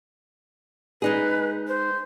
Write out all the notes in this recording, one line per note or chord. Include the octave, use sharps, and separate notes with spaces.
G#3 D#4 G#4 B4
C5